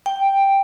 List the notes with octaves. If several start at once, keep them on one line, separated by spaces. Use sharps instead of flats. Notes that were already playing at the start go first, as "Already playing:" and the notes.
G5